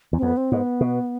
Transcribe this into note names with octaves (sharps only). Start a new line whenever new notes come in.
E2
C4
F2 B3
C4
G#2 B3
B2